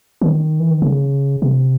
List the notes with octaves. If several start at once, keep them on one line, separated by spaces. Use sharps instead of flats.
D#3
E3
D#3
C#3
C3